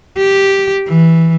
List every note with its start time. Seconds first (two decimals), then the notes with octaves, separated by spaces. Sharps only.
0.17 G4
0.87 E3